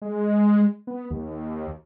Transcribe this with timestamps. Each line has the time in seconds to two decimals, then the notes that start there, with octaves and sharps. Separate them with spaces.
0.02 G#3
0.87 B3
1.11 D#2